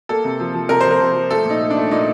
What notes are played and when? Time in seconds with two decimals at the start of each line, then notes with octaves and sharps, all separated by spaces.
0.09 A#3 A4
0.24 C3
0.40 F3
0.54 F3
0.69 C3 A#4
0.81 F3 C5
0.91 A#4
1.00 C3
1.16 F3
1.31 A3 A4
1.45 A#2
1.50 D#4
1.61 A3
1.70 D4
1.77 A3
1.91 A#2 D#4